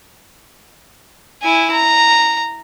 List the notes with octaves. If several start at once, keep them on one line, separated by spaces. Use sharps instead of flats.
E4 G#5
A#5